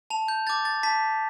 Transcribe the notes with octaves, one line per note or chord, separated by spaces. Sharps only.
A5 F7
G6
D6 G6 A6
A6
A5 B6